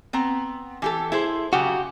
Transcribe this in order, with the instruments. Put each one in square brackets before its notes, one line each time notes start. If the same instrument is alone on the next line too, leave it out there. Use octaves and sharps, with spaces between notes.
[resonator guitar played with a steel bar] B3 C4 A#5
E3 G4 A4
E4 G#4 C5
[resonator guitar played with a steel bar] C#3 F#3 [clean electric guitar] F#4 G4